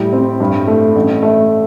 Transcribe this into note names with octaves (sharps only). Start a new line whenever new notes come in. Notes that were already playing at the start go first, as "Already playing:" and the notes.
Already playing: A2 G3
C4
G2
A3
A1
A3